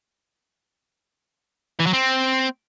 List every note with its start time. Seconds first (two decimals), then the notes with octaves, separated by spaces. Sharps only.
1.80 E3
1.87 F#3
1.93 C4